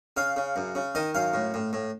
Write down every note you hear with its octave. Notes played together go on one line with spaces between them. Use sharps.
C#3 F5
C#3
F#2
C#3
D#3 D#5
F#2 F5
A2
A2
A2